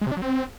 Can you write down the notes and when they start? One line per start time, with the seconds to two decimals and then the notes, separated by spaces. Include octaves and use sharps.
0.01 G#3
0.07 C3
0.12 D4
0.17 F#3
0.22 C4